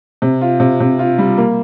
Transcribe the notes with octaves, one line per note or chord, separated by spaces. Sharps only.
C3
F4
C3
C3
F4
G3
A#3